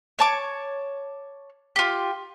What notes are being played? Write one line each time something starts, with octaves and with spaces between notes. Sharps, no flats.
C#5 A5 D6
F4 G4